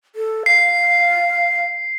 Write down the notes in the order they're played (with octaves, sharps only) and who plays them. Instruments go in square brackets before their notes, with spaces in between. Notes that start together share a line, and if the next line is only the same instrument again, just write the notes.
[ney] A4
[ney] F5 [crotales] C7